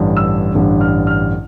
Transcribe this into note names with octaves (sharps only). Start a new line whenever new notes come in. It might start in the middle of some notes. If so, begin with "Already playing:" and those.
Already playing: A1 G2 D3 G3
E6
A1 G2 D3 G3
F6
F6